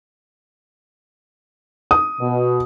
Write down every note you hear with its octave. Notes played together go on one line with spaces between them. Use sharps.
D#6
B2